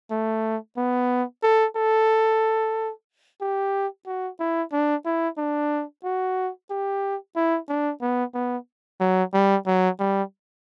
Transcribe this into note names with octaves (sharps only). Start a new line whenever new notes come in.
A3
B3
A4
A4
G4
F#4
E4
D4
E4
D4
F#4
G4
E4
D4
B3
B3
F#3
G3
F#3
G3